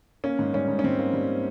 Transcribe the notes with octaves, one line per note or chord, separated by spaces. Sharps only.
A#3 C#4
G#2
G3 C#4
G#2
C#4
G#2 C4
A#3
G3